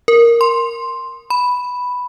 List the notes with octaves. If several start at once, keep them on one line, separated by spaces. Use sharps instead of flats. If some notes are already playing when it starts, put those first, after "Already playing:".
A#4
C6
B5